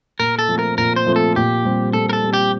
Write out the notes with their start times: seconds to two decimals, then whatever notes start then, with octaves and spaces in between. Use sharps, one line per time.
0.19 A#2 A#4
0.39 A4
0.49 F3 A3 C4
0.59 A#4
0.78 A#2 A#4
0.96 C5
1.07 F3 A3 C4
1.16 A4
1.36 A#2 G4
1.65 G3 C4
1.93 A#2 A4
2.09 A#4
2.13 A4
2.24 G3 C4
2.33 G4